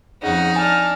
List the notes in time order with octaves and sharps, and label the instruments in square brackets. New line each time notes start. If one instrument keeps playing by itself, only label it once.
[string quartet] F2 C#3 [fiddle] D#4 [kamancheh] F#5
[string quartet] D4 [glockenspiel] G#5 [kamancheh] A5 F6